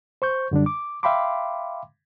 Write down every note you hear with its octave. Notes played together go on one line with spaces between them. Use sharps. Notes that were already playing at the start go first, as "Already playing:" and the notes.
C5 C#6 G6
F#2 D3 G3 D4
D6
E5 F5 G5 B5 C6 D6